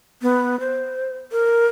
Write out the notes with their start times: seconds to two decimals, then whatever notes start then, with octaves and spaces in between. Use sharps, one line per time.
0.22 B3
0.60 C5
1.32 A#4